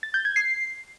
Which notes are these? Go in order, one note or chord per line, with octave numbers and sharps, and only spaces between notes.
A6
G6
G#6
C7